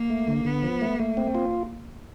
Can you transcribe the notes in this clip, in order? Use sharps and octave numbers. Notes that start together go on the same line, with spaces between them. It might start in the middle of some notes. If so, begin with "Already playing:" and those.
Already playing: A#3
A3
D3
D3 B3
F3
A3
A3 A#3
C4
F4